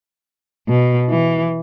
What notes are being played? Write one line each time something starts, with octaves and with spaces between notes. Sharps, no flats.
B2
E3